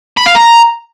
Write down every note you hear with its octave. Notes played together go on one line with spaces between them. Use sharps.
B5
F5
A#5